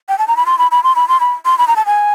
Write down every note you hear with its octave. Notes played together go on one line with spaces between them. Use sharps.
G5
A5
A#5
B5
C6
B5
B5
C6
B5
C6
B5
C6
B5
A#5
A5
G#5